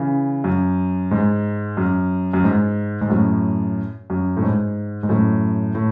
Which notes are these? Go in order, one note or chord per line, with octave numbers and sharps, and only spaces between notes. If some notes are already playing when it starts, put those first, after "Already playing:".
Already playing: C#3 E3
F#2
G#2
F#2
F#2
G#2
G#2
F#2 A2
F#2
A2
G#2
G#2
F#2 A2
A2